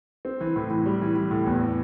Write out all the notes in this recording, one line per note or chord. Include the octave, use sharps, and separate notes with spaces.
C4
E3
A2
E3
G3
E3
E3
A2
E2